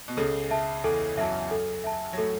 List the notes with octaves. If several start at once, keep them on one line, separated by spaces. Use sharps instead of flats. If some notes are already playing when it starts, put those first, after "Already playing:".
B2
C#2 C#3 A4
E5 A5
E2 E3 A4
F#2 F#3 E5 A5
A4
E5 A5
F#3
A2 A3 A4